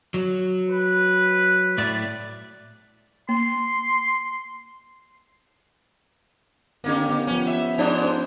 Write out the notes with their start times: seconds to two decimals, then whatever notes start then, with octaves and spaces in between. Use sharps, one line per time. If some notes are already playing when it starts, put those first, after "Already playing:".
0.14 F#3
0.71 B4
1.78 A2 D5 E5
3.29 A#3 C6
6.84 D3 A#3 B3 C#4 G4
7.09 B3
7.27 F3 B3 C#4
7.47 E5
7.78 G#2 F3 C#4
8.02 C5